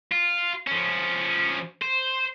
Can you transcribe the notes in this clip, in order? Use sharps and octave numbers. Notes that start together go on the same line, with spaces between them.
F4
F3 C#4
C5